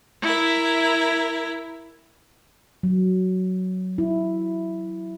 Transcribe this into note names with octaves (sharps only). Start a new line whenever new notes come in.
E4 A#4 E5
F#3
E4